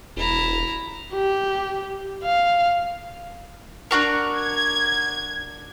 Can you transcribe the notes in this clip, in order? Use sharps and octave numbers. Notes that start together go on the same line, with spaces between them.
E1 E4 A#5
G4
F5
D4 F#4 A#4
G#6